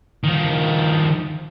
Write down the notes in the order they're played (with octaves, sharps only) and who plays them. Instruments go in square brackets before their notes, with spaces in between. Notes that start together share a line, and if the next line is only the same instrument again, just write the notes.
[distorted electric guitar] D#3 F3